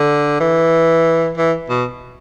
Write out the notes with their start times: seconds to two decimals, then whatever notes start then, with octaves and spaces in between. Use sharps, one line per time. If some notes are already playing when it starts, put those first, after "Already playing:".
Already playing: D3
0.40 E3
1.37 E3
1.69 B2